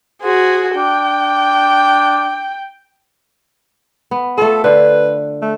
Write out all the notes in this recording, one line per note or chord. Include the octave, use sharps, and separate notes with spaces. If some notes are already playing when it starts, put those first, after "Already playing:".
F#4 G#4 C5
D4 G5
B3
A3 F4 A4
D3 B4 C5
A3